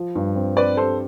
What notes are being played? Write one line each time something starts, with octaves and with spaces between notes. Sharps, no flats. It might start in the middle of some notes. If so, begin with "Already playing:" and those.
Already playing: F3
G2
C4
C4 B4 D5
G4 A4 C5